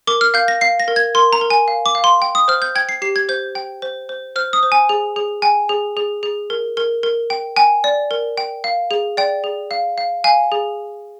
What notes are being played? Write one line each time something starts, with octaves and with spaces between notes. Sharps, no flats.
A#4 D6
F6
F5 G6
A#6
F5 C7
A#6
A#4
G#6
A#4 C6
A#5
A#4
G#5
F5
D6
F5
C6
G5
D#6
C5 F6
G6
G5 G#6
C7
G4 C7
G#6
C5 G6
G5
C5
C5
C5 F6
D#6
C5
G#5
G#4
G#4
G5 G#5
G#4
G#4
G#4
A#4
A#4
A#4
G5
G5 G#5
D5
A#4
G5
F5
G#4
D5 G5
G#4
F5
F5
F5 G#5
G#4